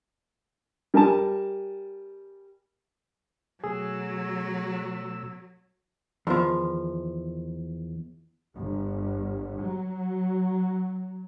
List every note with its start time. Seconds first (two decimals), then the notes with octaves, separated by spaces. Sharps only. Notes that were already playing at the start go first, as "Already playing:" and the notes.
0.94 G3 A#4 G#5 A5
3.64 B2 F#3 A3 G#4 E6
6.27 E2 D#3 F3
8.55 G1
9.60 F#3